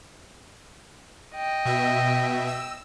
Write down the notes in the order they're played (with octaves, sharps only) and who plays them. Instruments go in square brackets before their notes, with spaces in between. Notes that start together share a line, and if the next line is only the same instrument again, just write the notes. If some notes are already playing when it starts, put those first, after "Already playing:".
[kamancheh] D#5 G5
[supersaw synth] B2 E5
E6